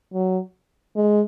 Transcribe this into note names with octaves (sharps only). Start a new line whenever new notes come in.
F#3
G#3